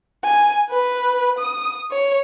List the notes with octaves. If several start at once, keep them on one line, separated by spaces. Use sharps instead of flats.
G#5
B4
D#6
C#5